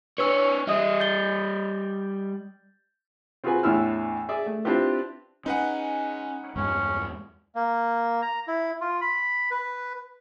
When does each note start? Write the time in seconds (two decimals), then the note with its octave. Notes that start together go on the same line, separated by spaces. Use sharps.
0.18 D4 B4 C#5 E6
0.68 G3 D#5 E5 D#6
1.00 G6 A6 G7
3.44 C4 F4 F#4 G#4 B4 G#5
3.63 E2 A2 D4 E4 E6 F6
4.29 G#4 D5 E5
4.46 A3
4.65 C4 D4 E4 F4 G4 B4
5.46 G#3 C#4 D#4 B4 F#5
6.56 E2 G2 G#3 C#4
7.55 A#3
8.22 A#5
8.47 E4
8.81 F4
9.01 B5
9.51 B4